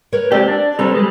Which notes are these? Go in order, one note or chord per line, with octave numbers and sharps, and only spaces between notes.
A#4 B4 C#5
G#3 C4 G4 D5
D4
G3 C4 A4 B4
G3 G#3